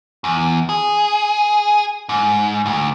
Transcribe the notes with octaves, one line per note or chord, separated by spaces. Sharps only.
E2
G#4
G#2
D2